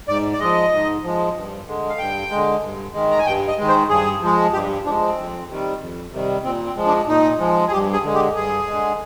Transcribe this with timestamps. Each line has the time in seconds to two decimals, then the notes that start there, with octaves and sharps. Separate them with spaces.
0.08 G#2 D5
0.33 D5
0.40 F3 G#3 D#5
0.72 G#2
1.03 F3 G#3
1.36 G2
1.67 D3 G#3
1.90 F5
1.99 G2 G5
2.31 D3 G#3
2.63 G2
2.94 D#3 G#3
3.11 A#5
3.18 G#5
3.26 G2 G5
3.48 D#5
3.58 D#3 G#3
3.69 C5
3.89 G2 G#4
4.22 F3 G#3
4.53 G2 G4
4.85 F3 D4
4.89 G#3
5.01 C4
5.17 F2
5.49 C3 D#3 G3
5.80 F2
6.12 C3 D#3 G3
6.44 A#2 C4
6.66 C4
6.76 F3 G#3
6.87 D4
7.08 A#2 D#4
7.39 F3 G#3
7.67 G#4
7.72 G2 G4
7.93 G#4
8.03 D3 G#3
8.14 G4
8.35 G2 G#4
8.67 D3 G#3